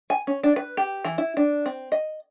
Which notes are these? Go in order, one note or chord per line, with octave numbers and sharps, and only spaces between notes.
G#5
C#4
D4
B4
G4
E3
E4
D4
C4
D#5